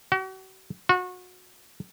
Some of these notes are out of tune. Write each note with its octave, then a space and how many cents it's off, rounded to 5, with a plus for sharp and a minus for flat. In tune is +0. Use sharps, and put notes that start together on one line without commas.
F#4 +40
F#4 -30